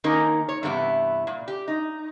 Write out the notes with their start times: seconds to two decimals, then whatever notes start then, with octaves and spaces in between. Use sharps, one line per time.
0.04 D#3 A#3 C#4 D#4 A#4
0.49 C#5
0.63 G2 C3 E3 B3 E4
1.27 A#2
1.48 G4
1.68 D#4